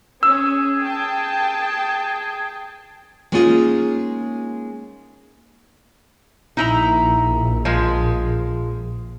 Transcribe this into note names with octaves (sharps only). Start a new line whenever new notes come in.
C#4 G#4 E6
G5 A5
G#3 A#3 C#4 D#4 F4 G#4
A#1 D#4 E4 A#5
F3 G#3